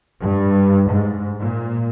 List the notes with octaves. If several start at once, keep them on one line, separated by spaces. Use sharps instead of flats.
G2
G#2
A#2